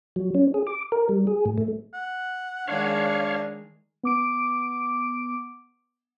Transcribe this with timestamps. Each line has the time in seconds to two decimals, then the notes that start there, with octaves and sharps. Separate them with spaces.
0.16 F#3
0.34 C#4
0.54 G#4
0.67 D6
0.92 A#4
1.09 G3
1.27 G#4
1.46 A2
1.58 A3
1.94 F#5
2.68 D#3 G#3 D4 G#4 C#5 F5
4.03 B3 D6 D7